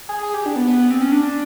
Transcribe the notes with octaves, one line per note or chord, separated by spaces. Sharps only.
G#4
G#4
G4
D4
B3
B3
B3
C4
C#4
D4